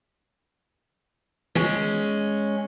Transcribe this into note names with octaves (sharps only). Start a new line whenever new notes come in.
G#3 C#4